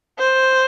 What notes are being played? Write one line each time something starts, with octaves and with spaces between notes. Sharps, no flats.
C5